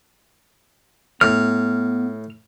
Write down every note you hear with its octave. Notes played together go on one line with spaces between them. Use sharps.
A2 B3 F6